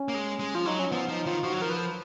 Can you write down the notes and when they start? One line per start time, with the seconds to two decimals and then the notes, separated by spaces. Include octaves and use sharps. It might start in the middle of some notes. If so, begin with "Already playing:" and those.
Already playing: C#4
0.08 A#3
0.15 G#3
0.39 G#3
0.55 F3 F4
0.65 F#3 D#4
0.79 C#4
0.91 F3 B3
1.09 F3 D#4
1.26 D#3 F4
1.43 F3 F#4
1.52 F#3
1.61 F3 A#4
1.70 B4